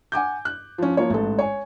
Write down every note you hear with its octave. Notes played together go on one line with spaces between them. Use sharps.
F#5 G#5 D6 G6
F#6
F3 C#4
F3 A#3 C#5
A1 G#2 A4
C#5 G#5